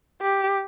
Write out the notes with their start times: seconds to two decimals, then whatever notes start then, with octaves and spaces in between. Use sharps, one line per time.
0.21 G4